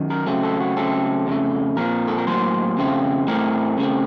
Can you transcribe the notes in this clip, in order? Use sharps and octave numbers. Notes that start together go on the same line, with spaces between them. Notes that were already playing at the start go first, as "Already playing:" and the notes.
Already playing: F#2 D#3
A#4
C#3 F#3 A3 C4
A4
F#4
C#3 F#3 A3 C4 A4
F2 C#3 A3
A#2 F3 C4 A#4
A4
A#4
A2 F#3 A#3 C5
F2 C#3 A3 C4
A2 A3 C4 A#4
C#3 A3 C4